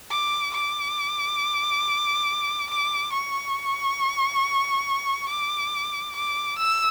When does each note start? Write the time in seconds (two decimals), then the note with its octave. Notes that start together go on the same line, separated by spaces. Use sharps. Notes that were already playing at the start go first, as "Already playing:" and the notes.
0.10 D6
0.54 D6
2.70 D6
3.13 C#6
5.29 D6
6.16 D6
6.58 E6